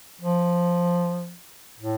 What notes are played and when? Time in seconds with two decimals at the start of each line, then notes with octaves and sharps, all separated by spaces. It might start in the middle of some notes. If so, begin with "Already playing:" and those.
0.21 F3
1.80 A2